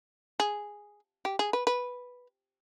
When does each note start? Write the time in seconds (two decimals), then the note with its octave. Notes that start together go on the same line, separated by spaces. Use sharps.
0.40 G#4
1.25 G4
1.39 G#4
1.53 B4
1.67 B4